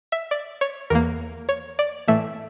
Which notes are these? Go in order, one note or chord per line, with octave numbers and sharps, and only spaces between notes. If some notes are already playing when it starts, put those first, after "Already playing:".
E5
D5
C#5
E2 E3 A#3 A#4
C#5
D5
A2 E3 A3 E5